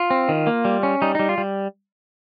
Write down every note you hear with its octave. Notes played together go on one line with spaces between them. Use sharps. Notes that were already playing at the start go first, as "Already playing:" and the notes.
Already playing: F4
C4
D#3
A#3
G3
C#4
G3 D#4
G3 D#4
F4
G3